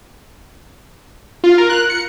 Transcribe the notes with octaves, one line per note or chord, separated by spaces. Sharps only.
F4
A#4
F#6
C#7